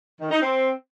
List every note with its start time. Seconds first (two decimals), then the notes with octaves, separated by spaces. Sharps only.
0.20 D#3
0.31 D#4
0.42 C4